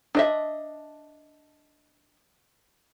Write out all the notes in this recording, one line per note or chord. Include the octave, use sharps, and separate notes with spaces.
D4 D#5 E5